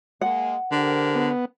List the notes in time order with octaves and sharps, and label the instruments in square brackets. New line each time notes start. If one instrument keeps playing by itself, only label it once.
[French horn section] G#3 A#3 [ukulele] F#5
[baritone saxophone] D3 [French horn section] G4 A#4 C5
[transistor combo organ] B3